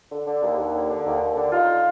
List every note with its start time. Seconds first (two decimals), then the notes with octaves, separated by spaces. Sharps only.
0.10 D3
0.26 D3
0.41 D#2
0.57 D#2
0.72 D3
0.89 D3
1.05 D#2
1.20 D#2
1.35 D3
1.51 D3 D#4 F4